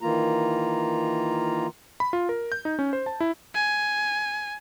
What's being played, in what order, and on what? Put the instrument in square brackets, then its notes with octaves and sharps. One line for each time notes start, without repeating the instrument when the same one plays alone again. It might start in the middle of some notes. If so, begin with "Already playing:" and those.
[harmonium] D#3 E3 A#3 F4 A#5
[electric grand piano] B5
F4
A#4
G6
D#4
C#4
C5
A5
E4
[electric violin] G#5